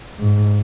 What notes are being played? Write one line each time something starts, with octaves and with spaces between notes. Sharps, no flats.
G#2